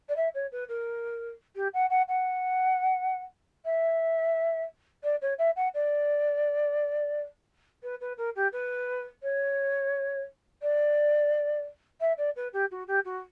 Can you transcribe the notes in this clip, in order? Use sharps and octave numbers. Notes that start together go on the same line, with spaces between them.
D5
E5
C#5
B4
A#4
G4
F#5
F#5
F#5
E5
D5
C#5
E5
F#5
D5
B4
B4
A#4
G4
B4
C#5
D5
E5
D5
B4
G4
F#4
G4
F#4